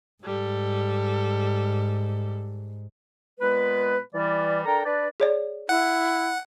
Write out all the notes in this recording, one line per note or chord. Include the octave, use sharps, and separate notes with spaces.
G#2 G3 A4
A#2 G#3 B3 B4
E3 G3 D5
D4 A4 A#4 G5 A#5
D4 B4 D5
G#4 C#5 D5
E4 F#5